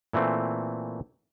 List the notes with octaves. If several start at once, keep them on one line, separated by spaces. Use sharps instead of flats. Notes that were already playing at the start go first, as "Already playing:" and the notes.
A#2 E3 A3 C4